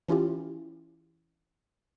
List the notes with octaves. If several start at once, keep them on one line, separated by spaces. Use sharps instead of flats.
E3 C#4 E4 F4 G4